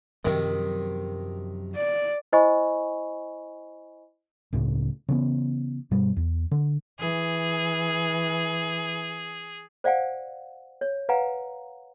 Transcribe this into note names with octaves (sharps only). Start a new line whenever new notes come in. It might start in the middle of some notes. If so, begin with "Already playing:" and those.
F#2 C3 D#3 F3 F#3
D5
E4 C5 D#5 G#5 B5 C#6
C#2 A2 C#3
C#3 E3 B3
G2 B2 G3
E2
D3
E3 G#4
C5 D5 F5 F#5 G#5
C#5
B4 F5 F#5 G#5 A#5